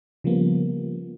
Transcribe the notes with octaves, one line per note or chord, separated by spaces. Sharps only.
C#3 F3 G3 A#3 B3